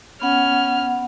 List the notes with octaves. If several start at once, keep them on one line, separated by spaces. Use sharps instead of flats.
B3 C#4 F#5 F6